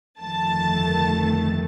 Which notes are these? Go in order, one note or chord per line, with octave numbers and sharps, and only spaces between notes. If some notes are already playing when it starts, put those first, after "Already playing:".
G1 F2 D#3 A3 A5